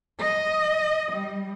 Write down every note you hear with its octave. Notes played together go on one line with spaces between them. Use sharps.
D#5
G3